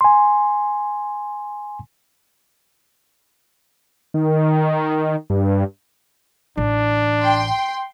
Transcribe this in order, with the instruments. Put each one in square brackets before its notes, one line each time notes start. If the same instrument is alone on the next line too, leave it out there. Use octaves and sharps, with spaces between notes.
[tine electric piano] G#5 C6
[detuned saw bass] D#3
G2
[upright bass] A1 [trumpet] D4
[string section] G5 C6